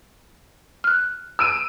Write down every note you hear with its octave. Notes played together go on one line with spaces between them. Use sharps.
F6 F#6
E6 D7 D#7